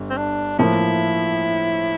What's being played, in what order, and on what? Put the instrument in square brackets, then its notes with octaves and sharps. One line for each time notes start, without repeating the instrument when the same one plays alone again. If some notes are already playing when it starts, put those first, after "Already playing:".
Already playing: [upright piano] G1
[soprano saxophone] C4
D4
[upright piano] A2 F3 A#3 [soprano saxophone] E4